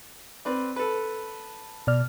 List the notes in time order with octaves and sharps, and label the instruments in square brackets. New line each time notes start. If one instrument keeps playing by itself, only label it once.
[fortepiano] C4 B4 D5
A4 B4
[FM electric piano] B2 D5 F6